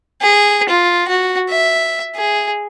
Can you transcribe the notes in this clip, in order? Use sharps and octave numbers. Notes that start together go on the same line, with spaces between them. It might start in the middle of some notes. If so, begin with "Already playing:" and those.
G#4
F4
F#4
E5
G#4